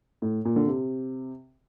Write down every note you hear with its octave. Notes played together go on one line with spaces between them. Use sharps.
A2
A#2
D3
C3